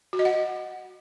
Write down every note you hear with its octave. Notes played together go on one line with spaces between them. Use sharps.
F#4
D#5
F#5